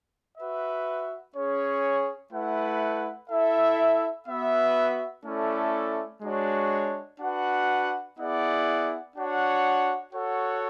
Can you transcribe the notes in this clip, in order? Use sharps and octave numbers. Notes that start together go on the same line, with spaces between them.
F#4 B4 E5
C#4 G#4 C#5
A3 E4 B4 F#5
E4 A4 E5
B3 F#4 B4 E5
A3 C#4 E4 A4 D5
G#3 D4 F#4 C#5
D4 F#4 B4 F#5
B3 E4 G#4 D5 F#5
D4 F#4 C#5 F#5
F#4 A4 C#5 F#5